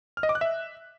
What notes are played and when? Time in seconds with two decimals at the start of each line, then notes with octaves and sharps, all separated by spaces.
0.17 F6
0.23 D#5
0.29 D6
0.35 F#6
0.41 E5